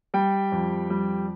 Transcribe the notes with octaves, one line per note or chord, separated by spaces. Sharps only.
G3 G5
F2
G3